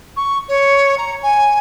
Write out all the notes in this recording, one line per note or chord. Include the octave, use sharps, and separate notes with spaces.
C#6
C#5
A#5
G#5